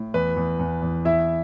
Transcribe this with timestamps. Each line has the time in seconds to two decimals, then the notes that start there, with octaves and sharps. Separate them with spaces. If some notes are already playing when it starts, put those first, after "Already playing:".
Already playing: A2
0.14 E2 B4
0.37 E2
0.59 E2
0.82 E2
1.05 E2 E4 E5